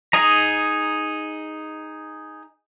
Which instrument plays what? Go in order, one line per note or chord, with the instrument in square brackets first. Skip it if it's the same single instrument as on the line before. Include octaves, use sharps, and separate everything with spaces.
[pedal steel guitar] D#4 G#4 D#5 A#5